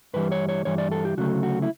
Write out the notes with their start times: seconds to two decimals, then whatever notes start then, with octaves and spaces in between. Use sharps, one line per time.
0.14 G2 E3 G3 B4
0.32 C#5
0.49 C#5
0.65 G2 E3 G3 C#5
0.78 D5
0.91 A4
1.05 G4
1.17 D2 C#3 F#3 A3 F#4
1.43 F#4
1.62 E4